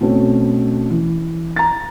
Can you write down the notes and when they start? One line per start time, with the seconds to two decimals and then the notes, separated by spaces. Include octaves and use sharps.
0.01 B2 A3 C4 C#4
0.90 E3
1.56 A#5 A6